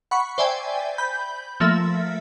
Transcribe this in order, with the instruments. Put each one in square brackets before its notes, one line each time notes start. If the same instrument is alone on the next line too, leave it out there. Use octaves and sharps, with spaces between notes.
[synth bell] F#5 B5 C#6
C5 D5 E5 G5 G#5
B5 G6
F3 A3 A#3 E5